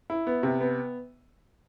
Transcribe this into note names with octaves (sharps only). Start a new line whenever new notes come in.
E4
B3
C3
B3